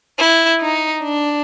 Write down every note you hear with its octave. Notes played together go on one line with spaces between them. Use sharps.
E4
D#4
D4